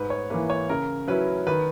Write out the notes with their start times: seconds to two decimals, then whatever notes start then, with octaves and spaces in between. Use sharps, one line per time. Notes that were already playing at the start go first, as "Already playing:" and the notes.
Already playing: G#2 B4
0.10 C#5
0.30 E3 A#3 B4
0.50 C#5
0.69 C#3 A#4
1.08 F#3 C#4 E4 B4
1.47 D#3 B4